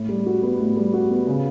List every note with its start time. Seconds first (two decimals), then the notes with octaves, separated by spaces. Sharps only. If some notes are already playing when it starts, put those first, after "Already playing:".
Already playing: A2
0.09 G3
0.26 F#4
0.43 B3
0.60 A2
0.76 G3
0.93 F#4
1.10 B3
1.27 C#3